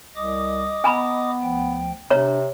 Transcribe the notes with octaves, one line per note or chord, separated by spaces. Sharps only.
C2 D#5 D6 D#6
B3 G#5 A#5 B5
D2 F3 G5
C3 D4 C#5 A#5